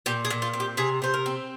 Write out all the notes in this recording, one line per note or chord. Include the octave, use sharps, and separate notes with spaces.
A#2 G4
G#4
A#2
F4
C4
G4
C3 G#4
C3 C5
A#4
C4